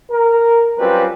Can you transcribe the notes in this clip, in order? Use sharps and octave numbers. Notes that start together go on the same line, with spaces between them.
A#4
F#3 G3 C4 C#4 F4 B4